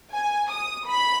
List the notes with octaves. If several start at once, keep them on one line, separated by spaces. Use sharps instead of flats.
G#5
D#6
B5